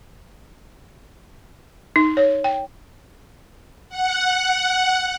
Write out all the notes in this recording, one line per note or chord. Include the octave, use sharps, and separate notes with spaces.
D#4
C#5
G5
F#5